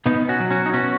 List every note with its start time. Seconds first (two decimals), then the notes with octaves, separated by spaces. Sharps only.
0.06 B2 B3 D#4
0.28 C#4 F#4
0.40 F#3
0.50 C#4 F#4
0.66 D#4
0.73 B2 C#4 F#4